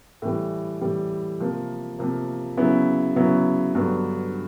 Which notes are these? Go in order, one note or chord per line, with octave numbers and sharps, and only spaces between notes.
A2 E3 G3
A2 E3 G3
C3 F3 A#3
C3 F3 A#3
C#3 F#3 B3 E4
C#3 F#3 B3 E4
G2 D3 F#3 B3